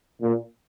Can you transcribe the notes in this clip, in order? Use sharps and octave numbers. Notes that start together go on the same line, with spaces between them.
A#2